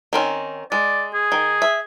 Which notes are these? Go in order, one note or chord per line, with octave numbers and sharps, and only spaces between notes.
D#3 C4 C#4
G#3 D5
G#4
D#3
E5